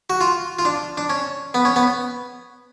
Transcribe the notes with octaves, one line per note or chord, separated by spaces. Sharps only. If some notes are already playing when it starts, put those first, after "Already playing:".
F#4
F4
F4
D4
D4
C#4
B3
C#4
B3